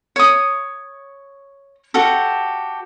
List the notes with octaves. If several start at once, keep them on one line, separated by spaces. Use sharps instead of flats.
C#5 D#6
F#4 G4 A4